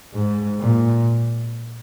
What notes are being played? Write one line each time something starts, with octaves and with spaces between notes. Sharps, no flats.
G#2
A#2